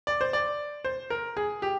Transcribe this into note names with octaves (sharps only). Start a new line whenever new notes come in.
D5
C5
D5
C5
A#4
G#4
G4